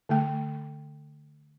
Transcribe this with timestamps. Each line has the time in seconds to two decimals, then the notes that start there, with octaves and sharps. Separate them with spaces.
0.09 D3 A3 G5